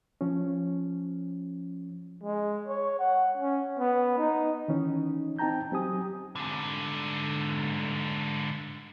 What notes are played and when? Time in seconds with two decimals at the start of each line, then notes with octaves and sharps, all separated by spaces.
0.21 F3 C#4
2.23 G#3
2.68 C#5
3.00 F#5
3.37 C#4
3.79 B3
4.18 D#4
4.68 D#3 E3 C#4 D#4
5.39 C4 D#4 G5 A5 A#5 G6
5.72 F#3 C4 G4 G#5 D#6
6.36 G#2 D3